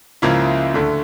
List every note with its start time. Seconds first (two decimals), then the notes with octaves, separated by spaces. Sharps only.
0.22 C#2 C#3 F3 A#3 E4 E5
0.74 D2 D3 A3